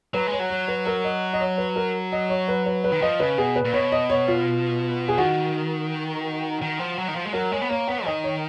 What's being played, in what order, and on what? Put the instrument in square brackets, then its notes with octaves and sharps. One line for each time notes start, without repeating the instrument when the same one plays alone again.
[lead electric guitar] F#3 [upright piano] B4
[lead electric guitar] G#3
[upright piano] C#5
[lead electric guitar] F#3
[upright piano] C#5
B4
A#4
D#5
D#5
C#5
B4
A#4
D#5
C#5
B4
B4
B4
[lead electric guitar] D#3
[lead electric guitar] F3 [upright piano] D#5
[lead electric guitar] C#3 [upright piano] B4
[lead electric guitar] B2 [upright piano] G#4
[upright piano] B4
[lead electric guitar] A#2
[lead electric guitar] B2 [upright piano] C#5
[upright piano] D#5
C#5
F4
G#4
[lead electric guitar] D#3 [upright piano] F#4
[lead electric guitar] D#3
F3
F#3
D#3
F3
G#3
[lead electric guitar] F#3 [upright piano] A#4
[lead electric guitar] G#3 [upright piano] C#5
[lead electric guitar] B3
[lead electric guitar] A#3 [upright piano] C#5
[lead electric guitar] B3 [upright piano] C#5
[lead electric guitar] D#3 [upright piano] D#5
[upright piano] C#5